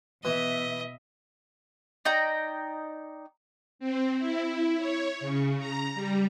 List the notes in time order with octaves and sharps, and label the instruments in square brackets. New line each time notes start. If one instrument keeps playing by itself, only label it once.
[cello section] B2 E5 [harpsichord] E3 [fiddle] D#5
[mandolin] D#4 D5 G5 A#5
[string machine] C4
E4
C#5
C#3
A#5
G3